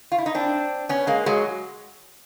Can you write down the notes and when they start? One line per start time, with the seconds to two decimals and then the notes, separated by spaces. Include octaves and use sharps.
0.12 F4
0.18 E4
0.26 D#4
0.35 C4 D4
0.89 B3 C#4
1.07 G#3 A#3
1.26 F#3 G#3